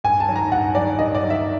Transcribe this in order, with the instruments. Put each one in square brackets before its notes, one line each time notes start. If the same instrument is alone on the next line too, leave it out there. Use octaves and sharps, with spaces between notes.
[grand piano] G2 [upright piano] G#5
[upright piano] A5
[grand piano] D#3 F#3
[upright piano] A#5
[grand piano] G2 [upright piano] F#5
[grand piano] D#3 F#3 [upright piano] D5
[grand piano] G2 [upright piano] D#5
[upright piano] D5
[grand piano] D#3 F#3
[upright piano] E5